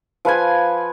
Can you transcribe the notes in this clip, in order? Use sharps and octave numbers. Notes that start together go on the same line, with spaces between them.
F3 B4 F5 G#5